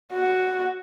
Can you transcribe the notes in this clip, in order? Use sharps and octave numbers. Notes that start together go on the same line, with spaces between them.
F#4